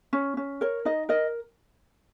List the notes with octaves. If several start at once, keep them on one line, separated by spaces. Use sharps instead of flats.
C#4
C#4
A#4 C#5
D#4 D#5
A#4 D#5